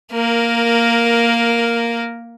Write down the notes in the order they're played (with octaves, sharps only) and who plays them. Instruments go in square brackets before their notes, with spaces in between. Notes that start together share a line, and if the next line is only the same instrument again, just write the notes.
[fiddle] A#3 A#4